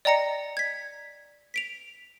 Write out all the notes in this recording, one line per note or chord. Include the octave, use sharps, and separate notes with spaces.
D5 D#5 G5 A#5 A#6 C#7
G#6 B6
B6 D7 F7